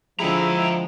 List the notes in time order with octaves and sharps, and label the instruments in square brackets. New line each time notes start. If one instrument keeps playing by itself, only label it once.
[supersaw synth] D3 G#3 [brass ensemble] F3 [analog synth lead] E4 [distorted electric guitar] G5 A#5